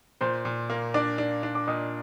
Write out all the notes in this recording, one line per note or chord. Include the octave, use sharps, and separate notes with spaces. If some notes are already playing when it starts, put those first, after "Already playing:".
A#2 C5 C6
A#2
A#3
D4 D5 D6
D4
D4
D6
A#2 D#5 D#6